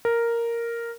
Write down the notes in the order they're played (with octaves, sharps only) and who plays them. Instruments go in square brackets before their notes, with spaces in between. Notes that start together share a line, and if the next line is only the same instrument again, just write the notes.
[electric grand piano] A#4